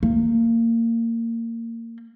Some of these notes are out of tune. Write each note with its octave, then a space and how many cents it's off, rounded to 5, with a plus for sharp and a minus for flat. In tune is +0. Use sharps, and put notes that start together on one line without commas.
A#3 -25